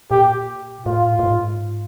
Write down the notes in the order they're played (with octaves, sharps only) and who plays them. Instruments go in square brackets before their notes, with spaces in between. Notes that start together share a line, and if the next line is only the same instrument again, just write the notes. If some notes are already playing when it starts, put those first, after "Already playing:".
[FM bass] A#2 [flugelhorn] G4
[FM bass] A2 [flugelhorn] F4
[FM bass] A2
G#2